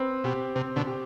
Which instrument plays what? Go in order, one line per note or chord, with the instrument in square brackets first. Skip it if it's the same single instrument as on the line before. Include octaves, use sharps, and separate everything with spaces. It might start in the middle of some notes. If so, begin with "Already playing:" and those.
Already playing: [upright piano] C4 B4
[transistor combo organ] B2 [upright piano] G4
[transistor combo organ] C3 [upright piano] C4
[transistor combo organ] B2 D3
[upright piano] G4